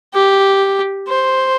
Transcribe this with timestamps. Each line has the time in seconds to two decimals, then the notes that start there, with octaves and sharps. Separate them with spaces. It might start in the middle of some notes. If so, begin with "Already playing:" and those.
0.14 G4
1.08 C5